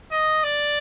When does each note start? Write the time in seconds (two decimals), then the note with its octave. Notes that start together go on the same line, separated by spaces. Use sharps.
0.11 D#5
0.44 D5